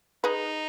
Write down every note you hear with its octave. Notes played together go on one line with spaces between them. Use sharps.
D#4 G#4 B4